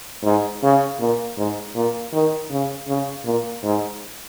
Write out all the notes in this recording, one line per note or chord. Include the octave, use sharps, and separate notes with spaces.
G#2
C#3
A#2
G#2
A#2
D#3
C#3
C#3
A#2
G#2